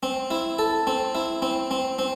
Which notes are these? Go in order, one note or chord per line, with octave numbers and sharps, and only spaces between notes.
C4
E4
A4
C4
E4
C4
C4
C4